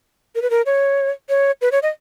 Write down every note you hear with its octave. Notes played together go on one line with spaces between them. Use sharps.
A#4
B4
A#4
C#5
C#5
B4
C#5
D#5